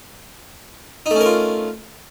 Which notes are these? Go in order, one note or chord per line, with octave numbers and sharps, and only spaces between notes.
A3 C#4 D#4 F4 A#4